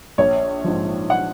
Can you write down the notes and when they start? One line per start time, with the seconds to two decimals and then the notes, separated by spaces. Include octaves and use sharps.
0.18 A#1 C#5
0.64 G#2 F3
1.10 F#5